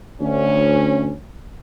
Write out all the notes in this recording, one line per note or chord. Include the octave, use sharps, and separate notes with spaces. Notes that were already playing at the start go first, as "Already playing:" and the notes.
D2 C#4